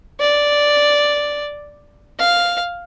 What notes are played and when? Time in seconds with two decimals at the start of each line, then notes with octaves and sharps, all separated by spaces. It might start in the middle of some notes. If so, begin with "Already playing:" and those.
0.20 D5
2.20 F5